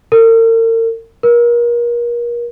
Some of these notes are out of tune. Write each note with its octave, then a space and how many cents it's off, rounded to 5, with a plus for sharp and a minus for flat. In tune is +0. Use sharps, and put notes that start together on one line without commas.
A#4 -45
A#4 +35